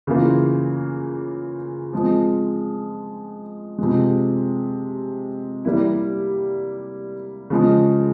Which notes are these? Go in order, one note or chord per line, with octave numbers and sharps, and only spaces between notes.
C#3 E3 A#3 F4
F3 G#3 C4
C3 F3 G#3
G3 A#3 E4
C#3 F3 G#3